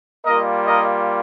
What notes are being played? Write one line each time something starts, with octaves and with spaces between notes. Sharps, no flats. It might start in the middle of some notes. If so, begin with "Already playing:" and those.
G3 A#3 F4 A#4 D#5
A#4 D#5